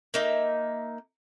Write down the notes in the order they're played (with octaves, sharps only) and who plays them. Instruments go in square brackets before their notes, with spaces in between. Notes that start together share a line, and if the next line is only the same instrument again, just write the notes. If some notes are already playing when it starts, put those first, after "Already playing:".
[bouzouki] A#3 D#4 E5